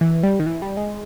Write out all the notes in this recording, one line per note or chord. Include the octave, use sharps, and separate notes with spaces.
E3
G3
D#3
E3
G3
G#3